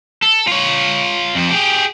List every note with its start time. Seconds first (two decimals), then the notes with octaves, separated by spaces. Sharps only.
0.22 A4
0.47 F4 C#5
1.35 F2 F3
1.50 G4 G#4